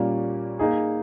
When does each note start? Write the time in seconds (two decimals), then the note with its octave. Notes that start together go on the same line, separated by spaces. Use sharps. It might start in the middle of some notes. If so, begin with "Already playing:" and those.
Already playing: A#2 G3 A#3 C#4
0.59 A#3 D#4 G#4